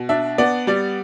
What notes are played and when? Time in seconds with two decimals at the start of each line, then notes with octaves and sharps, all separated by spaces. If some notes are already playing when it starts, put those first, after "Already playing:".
Already playing: B2
0.09 D4 E5
0.38 B3 D5
0.67 G3 D5